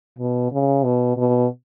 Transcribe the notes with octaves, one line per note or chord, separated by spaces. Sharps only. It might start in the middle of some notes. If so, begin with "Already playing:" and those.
B2
C#3
B2
B2